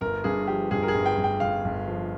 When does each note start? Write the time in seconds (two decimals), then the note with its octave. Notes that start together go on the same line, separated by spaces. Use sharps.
0.01 G1 A#4
0.24 G2 G#4
0.47 F3 G4
0.71 G2 G#4
0.83 A#4
0.88 G#4
0.94 G1
1.06 G5
1.17 G1
1.24 G5
1.40 G1 F5
1.64 G1
1.87 F3